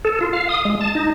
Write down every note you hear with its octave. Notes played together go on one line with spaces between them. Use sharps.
A4
F4
F5
D#6
G#3
A5
D#4